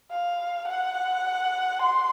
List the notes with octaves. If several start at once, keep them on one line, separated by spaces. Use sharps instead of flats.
F5
F#5
C6